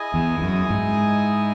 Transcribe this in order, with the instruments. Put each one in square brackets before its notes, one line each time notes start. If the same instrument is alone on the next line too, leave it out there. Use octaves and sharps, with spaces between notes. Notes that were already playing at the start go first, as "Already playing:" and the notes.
Already playing: [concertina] E4 G#4 D#5 G#5
[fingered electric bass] E2
F#2
G#2